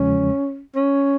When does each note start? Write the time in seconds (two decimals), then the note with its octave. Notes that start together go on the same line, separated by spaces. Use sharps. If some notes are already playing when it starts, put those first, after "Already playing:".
Already playing: E2 C#3 F3 G#3 C#4
0.75 C#4